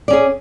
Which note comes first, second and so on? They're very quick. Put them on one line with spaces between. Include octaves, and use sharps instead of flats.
D5 C#4 G#4